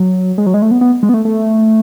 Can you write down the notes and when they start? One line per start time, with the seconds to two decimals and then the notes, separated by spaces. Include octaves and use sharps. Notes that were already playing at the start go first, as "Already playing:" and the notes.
Already playing: F#3
0.38 G#3
0.46 F#3
0.54 G#3
0.62 A3
0.71 B3
0.81 B3
1.03 G#3
1.09 B3
1.14 A3
1.25 A3